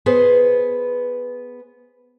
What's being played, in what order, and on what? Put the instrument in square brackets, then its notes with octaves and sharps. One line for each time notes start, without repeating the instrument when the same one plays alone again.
[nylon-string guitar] B3 G#4 B4 C5